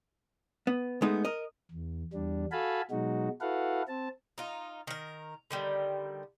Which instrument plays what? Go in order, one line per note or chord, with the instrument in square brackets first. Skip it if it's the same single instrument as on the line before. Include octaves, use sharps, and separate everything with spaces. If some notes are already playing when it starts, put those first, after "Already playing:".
[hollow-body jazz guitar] B3
G#3 A3 B3 D#4
A#4 D#5
[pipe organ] E2
E2 G3 D4
F#4 A4 F5 G#5 A5 B5
B2 F#3 G#3 D#4 F#4
E4 F#4 A4 B4 F5 F#5
C4 A5
[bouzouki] D#4 F4
D#3 A#4
D3 D#3 G3